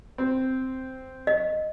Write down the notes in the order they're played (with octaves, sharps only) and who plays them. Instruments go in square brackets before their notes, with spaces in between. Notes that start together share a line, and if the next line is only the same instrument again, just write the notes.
[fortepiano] C4
[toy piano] D#5